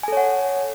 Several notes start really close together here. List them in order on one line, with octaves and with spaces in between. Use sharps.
G#5 A4 C#5 F#5